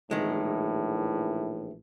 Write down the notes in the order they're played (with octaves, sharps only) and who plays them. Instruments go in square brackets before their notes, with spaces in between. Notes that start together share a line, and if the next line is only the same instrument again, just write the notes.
[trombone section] A#1 A2 E3 [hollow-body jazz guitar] D#3 G#3